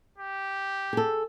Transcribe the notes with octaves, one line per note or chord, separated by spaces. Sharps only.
G4
G#4 A4